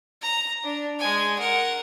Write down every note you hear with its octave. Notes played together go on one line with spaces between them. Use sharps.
A#5
D4
G#3 G#5
A#4 F#5